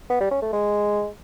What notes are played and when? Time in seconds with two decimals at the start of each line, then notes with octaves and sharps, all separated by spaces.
0.10 B3
0.20 G3
0.31 C#4
0.42 A3
0.53 G#3